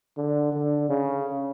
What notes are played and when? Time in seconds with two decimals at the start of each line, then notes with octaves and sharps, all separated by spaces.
0.18 D3
0.53 D3
0.89 C#3